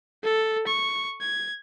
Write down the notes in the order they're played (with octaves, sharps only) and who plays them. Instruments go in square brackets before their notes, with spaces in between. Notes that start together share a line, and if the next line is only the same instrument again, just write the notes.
[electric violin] A4
C#6
G#6